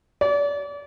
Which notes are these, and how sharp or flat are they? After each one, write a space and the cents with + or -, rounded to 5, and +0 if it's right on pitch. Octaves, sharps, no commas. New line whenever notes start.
D5 -35